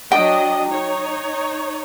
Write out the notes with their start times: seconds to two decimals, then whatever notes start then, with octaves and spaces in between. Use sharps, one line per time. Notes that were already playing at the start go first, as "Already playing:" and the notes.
0.12 F#3 D4 D#5 G5
0.69 D#4 C#5